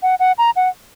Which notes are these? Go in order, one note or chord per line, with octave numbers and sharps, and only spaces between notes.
F#5
F#5
A#5
F#5